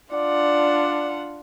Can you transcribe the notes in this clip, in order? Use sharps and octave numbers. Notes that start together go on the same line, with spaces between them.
D4 F4 D5 F#5